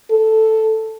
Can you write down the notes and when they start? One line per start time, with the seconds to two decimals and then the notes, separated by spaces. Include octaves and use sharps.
0.11 A4